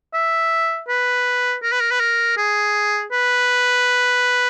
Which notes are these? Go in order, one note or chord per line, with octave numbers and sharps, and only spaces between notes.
E5
B4
A#4
B4
A#4
B4
A#4
G#4
B4